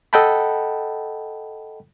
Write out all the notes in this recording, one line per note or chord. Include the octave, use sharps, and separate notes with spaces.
A4 D#5 F#5 G5 A5 B5